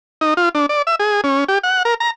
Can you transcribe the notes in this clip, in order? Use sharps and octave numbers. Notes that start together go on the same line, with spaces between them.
D#4
F4
D4
D5
E5
G#4
C#4
G4
F#5
A#4
A#5